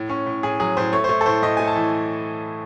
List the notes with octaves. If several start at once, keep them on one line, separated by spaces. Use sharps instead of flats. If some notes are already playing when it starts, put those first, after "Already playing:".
Already playing: A2
C#4
A2
A2 G#4
F#3 G#4
A2 C5
A3 C#5
C5
A3 C#5
A4
A2 C5
A2 D#5
A3 G#5
A5
E3